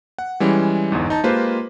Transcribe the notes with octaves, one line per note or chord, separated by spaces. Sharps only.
F#5
E3 G3 G#3 C#4
G1 E2 G#2
D#4 A5
G#3 A#3 F4 G4 B4 C5